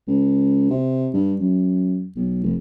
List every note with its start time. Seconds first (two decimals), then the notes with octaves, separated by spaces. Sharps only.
0.08 C#2
0.70 C3
1.14 G2
1.40 F#2
2.16 B1
2.44 F1